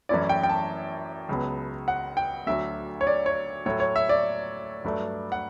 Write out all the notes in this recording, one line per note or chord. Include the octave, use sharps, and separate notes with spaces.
F#2 E3 A3 C#4 E4 D5
G5
G5
A5
C#2 C#3 F#3 B3
F#5
G5
D2 D3 F#3 E5
C#5
D5
C#5
A2 F#3 A3 C#5
C#5
E5
D5
G2 F#3 A3 D4
F#5